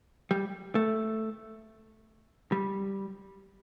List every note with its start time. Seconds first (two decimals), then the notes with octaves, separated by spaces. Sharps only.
0.31 G3
0.75 A3
2.52 G3